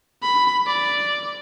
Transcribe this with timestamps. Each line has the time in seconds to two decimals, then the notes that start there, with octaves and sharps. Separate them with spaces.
0.22 B5
0.67 D5